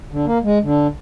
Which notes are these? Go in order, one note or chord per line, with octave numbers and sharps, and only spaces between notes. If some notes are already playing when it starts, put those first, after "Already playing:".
D3
A#3
G#3
D3